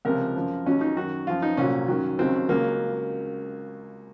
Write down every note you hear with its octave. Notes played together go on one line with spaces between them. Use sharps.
C#2 C3 F3 A#4
F#2 F3
D#2 C#3 F#3 C#4
D#4
F#2 D#3 F#3 F#4
F#2 F3 F4
D#4
C2 A#2 F#3 C#4
F#2 D#3 F#3
D#2 C#3 F#3 C4
C#2 C#3 F#3 A#3